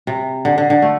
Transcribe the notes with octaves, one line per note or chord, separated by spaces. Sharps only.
C3
D3
D3
D3
A3